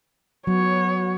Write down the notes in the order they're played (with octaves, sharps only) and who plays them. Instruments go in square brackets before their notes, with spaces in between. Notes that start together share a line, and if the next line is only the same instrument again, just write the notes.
[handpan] F#3 [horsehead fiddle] B3 C#5